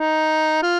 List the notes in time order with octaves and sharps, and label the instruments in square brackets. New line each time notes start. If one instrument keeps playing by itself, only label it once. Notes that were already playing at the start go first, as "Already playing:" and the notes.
Already playing: [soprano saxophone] D#4
F4